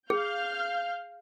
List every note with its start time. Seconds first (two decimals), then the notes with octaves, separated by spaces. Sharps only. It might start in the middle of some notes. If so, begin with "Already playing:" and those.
0.10 G#4 F5 F6 G6